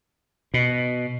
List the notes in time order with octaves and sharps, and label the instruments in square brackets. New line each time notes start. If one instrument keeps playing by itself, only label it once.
[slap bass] B2